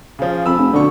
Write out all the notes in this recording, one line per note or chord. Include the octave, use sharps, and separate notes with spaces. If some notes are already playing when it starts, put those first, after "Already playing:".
C#3 F3
F2 B5 E6
F1
B2 D3 C#6